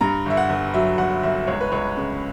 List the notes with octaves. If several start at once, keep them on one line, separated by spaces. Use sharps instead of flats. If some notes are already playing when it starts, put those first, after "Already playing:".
G2 A#5
G1 E5
F#5
G1
F#3 E5
G1 F#5
G1 E5
C#2 C#5
B4
C#2 C#5
C#3